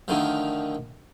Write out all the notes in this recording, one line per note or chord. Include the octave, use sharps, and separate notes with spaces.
D2 D3 D#3 F3